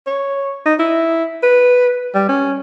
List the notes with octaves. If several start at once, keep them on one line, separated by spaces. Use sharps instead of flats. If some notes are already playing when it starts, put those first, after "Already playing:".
C#5
D#4
E4
B4
G3
C#4